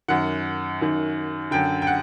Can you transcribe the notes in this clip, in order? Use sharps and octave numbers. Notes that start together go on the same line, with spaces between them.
F#2 D#3 F#5
F#2 D#3
F#2 D3 G5
G5
F#5